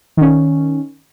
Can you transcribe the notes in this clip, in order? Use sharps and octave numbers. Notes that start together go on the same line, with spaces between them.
D#3 C#4